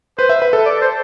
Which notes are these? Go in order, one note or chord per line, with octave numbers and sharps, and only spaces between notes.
B4 C5
E5
B4
A4
D5
C5